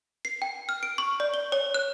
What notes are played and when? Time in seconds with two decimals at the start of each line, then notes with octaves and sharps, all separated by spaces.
0.25 C7
0.42 G5
0.69 F6
0.83 D7
0.98 C#6
1.20 D5
1.34 G7
1.52 C#5
1.74 F#6